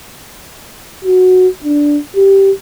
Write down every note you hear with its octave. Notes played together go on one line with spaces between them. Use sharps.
F#4
D4
G4